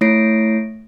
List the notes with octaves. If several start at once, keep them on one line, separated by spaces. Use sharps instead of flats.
A3 E4 C#5 A#6 C7 D7